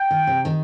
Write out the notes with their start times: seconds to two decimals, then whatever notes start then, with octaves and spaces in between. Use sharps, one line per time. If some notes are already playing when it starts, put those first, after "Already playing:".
Already playing: G5
0.11 D#3
0.27 C3
0.45 D#3